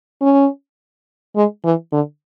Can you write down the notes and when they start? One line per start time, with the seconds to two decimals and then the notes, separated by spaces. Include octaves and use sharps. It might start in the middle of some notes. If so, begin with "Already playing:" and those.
0.21 C#4
1.36 G#3
1.64 E3
1.92 D3